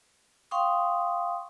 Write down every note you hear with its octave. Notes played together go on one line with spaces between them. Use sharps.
F5 G5 C6 C#6 D#6